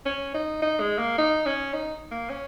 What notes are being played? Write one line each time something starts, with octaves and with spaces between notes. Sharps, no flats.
C#4
D#4
D#4
G#3
A#3
D#4
C#4
D#4
A#3
C#4